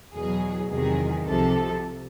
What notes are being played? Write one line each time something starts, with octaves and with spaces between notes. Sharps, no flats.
E2 B2 F#3 G#4
E2 C3 D#3 F#3 G#4
C2 C3 F3 A4